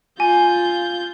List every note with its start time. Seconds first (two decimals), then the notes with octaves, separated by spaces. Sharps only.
0.20 F4 G#5 G6